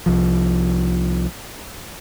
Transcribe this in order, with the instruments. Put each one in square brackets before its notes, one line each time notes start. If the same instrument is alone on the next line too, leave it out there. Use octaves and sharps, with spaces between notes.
[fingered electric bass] C2 F3